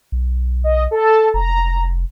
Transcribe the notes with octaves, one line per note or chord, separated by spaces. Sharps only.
B1
D#5
A4 A5
F1 A#5